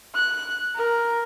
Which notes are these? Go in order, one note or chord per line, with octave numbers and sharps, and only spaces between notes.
F#6
A#4